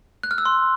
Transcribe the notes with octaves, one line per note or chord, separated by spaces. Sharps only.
F#6
F6
E6
C6